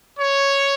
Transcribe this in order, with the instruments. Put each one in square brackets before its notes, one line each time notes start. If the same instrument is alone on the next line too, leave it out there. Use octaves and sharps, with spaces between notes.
[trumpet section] C#5